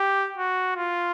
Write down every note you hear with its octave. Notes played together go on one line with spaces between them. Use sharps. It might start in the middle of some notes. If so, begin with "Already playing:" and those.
Already playing: G4
F#4
F4